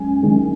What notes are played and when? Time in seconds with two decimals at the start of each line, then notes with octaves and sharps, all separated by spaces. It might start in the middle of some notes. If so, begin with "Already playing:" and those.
Already playing: F#2 G#3 G#5
0.23 F#2 D#3 G#3